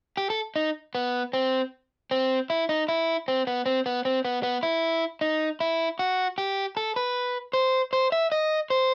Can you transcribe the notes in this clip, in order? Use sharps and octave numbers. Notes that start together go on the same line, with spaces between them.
G4
A4
D#4
B3
C4
C4
E4
D#4
E4
C4
B3
C4
B3
C4
B3
B3
E4
D#4
E4
F#4
G4
A4
B4
C5
C5
E5
D#5
C5